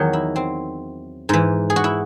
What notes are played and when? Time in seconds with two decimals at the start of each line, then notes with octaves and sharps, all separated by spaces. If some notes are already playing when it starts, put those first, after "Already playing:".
Already playing: E2 D#3 F#3
0.13 E4
0.36 C4
1.29 G#2 E3
1.70 G#4
1.76 F#4
1.84 E4